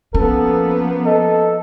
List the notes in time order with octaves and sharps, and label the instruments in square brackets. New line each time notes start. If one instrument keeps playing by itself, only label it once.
[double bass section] F3 A#3 B3 [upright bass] C#4 [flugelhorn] A4
[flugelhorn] A4 [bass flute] D#5